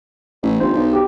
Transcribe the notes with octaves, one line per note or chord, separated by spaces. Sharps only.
A1
G1 C5
B1
G4